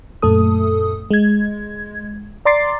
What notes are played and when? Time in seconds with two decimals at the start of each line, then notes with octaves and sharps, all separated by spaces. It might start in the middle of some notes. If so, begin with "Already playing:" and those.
0.22 F#2 A#2 A3 A4 D#6
1.11 G#3 G#6
2.45 D5 A#5 C6 D6 A6 C7